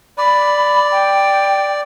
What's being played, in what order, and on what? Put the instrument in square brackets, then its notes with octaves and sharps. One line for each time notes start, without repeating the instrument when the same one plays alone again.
[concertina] D5 [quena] B5
[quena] G5